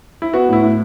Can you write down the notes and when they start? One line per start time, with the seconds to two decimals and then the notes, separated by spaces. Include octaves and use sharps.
0.22 E4
0.33 B3 F#4
0.49 A2 E4
0.62 A2